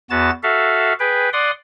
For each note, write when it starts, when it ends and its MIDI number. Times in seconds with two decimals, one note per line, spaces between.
0.10 0.30 40
0.10 0.30 59
0.10 0.30 66
0.10 0.30 81
0.10 0.30 93
0.43 0.93 66
0.43 0.93 69
0.43 0.93 76
0.43 0.93 77
1.00 1.29 68
1.00 1.29 71
1.00 1.29 79
1.33 1.51 74
1.33 1.51 78
1.33 1.51 84
1.33 1.51 87